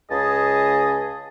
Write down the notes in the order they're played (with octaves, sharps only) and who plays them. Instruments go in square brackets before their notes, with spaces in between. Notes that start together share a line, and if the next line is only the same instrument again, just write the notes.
[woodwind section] C#2 C#3 G#4 D#5 A5